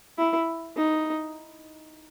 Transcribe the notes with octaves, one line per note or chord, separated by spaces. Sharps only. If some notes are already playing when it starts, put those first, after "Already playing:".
E4
D#4